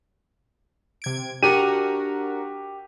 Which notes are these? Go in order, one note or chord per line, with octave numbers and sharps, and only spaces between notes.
C3 G#6 D7
D4 F#4 G4 A#4 D#7